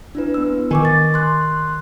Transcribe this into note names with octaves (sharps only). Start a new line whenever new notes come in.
D4 E4 B4
B3 E6
D#3 G#5 C#6 D6
A6
C6 F#6